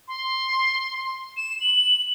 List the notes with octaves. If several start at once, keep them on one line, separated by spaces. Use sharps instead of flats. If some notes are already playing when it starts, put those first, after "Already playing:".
C6
E7
F#7